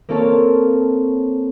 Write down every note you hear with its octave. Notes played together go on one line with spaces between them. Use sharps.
A#3 C4 F4 A4 C#5 A5